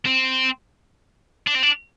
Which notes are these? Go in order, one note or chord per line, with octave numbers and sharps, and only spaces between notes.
C4
D4
C4
D4